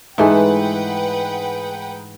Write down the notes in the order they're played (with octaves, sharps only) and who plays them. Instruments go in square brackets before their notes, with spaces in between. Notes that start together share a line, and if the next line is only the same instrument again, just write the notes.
[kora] G#2 E3 A3 [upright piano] G#3 D#4 [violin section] B4 F#5 G5